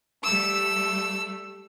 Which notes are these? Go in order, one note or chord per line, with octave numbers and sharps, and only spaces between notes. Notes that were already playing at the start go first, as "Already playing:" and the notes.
G3 A3 E6